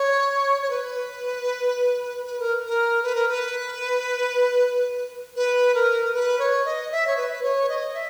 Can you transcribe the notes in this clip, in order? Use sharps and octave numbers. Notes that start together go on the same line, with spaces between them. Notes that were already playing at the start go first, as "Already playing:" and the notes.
Already playing: C#5
C#5
B4
B4
A#4
A#4
B4
A#4
B4
B4
A#4
A#4
B4
C#5
D#5
E5
C#5
B4
C#5
D#5
E5